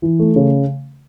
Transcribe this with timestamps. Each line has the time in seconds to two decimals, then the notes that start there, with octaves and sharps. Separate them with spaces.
0.02 E3
0.19 A3
0.36 C#3